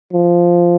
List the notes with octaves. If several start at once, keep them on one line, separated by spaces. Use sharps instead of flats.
F3